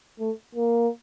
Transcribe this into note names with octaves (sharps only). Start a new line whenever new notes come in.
A3
A#3